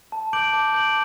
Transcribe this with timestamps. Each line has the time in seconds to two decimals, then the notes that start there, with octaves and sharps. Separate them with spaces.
0.12 A5
0.33 D6 G6 D7 F#7
0.53 A5
0.73 D6 G6 D7 F#7